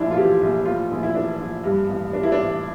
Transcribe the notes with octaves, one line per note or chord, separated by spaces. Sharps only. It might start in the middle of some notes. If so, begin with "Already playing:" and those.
Already playing: A#1 A2 D4 E4
F4
E3 G4
A#1
A2 F4
A#1
E4
E3 D4
A#1
G2
A1
F3 D4
E4
D4
A1